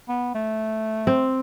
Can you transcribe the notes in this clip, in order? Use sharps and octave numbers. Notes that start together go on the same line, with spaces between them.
B3
A3
C4